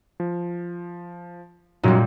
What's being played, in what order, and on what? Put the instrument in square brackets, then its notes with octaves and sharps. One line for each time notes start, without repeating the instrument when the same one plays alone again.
[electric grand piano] F3
[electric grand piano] F#2 F#3 D#4 [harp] A#2 G3